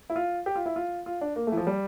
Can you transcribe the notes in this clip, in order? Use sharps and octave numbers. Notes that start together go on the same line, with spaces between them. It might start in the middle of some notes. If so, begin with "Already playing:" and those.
E4
F4
G4
F4
E4
F4
F4
D4
A#3
A3
E3
F3
G3